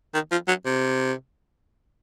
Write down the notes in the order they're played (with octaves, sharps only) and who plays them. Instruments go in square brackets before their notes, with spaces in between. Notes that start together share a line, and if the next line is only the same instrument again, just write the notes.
[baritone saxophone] D#3
F3
F#3
C3